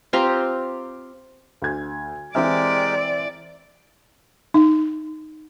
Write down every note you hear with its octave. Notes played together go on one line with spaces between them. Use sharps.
C4 F4 G4 A#5
D2 G#6
E3 G#3 C4 G4 A#4 D5 E5
D#4